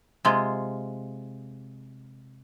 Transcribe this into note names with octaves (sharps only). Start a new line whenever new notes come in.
C3 G#3 F4